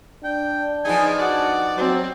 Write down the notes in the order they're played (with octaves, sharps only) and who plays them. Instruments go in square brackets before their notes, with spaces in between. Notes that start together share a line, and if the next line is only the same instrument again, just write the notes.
[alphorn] D4 [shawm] G5
[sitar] F3 B3 D#4 [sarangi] G#4 [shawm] G#5
[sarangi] F#4 [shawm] D5
[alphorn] F#3 [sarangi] C4